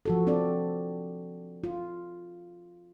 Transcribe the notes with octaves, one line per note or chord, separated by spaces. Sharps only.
F3 F#4 A4
C4 D4 A4 D5
F4